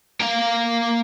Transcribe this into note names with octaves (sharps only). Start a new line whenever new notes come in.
A#3 F5